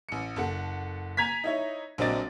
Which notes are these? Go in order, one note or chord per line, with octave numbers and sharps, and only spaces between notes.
A1 C#7
F#1 A4 F#5
G#5 A#5 G#6 B6
D#4 E4 C#5
A#1 F#3 C4 D4 D#5 A6